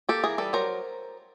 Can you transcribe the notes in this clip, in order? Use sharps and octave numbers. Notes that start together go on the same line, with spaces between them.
A#3 G4 A4
E3 G#4 A#4
G3 A4 B4
F#3 A#4 C5